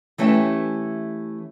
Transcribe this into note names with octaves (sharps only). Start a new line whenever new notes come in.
E3 A3 C#4 G4 E5